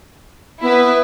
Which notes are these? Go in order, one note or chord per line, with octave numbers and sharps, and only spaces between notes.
B3 E4 B4